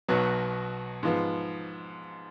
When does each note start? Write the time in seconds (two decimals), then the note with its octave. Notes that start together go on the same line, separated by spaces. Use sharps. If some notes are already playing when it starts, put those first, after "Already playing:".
0.08 B1 B2 F#3 B3 F#4
1.03 G#2 F3 B3